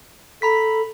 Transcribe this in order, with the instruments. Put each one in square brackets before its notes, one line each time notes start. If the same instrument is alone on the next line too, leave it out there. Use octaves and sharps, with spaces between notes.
[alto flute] A4 [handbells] A#5 B5 B6